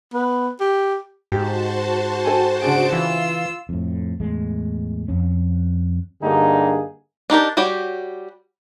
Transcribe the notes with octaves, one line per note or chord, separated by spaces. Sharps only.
B3
G4
G#2 F#4 G4 C5 A5
A4 G5 G#5
C#3 D4 G#4 F#5 D7
E3 F4 E6
F2 A2
E2 A2 G#3
F2 C#4
G2 D3 A#3 D#4 G4 G#4
D4 D#4 G4 A#4
G3 F#4 G4 C#5 G5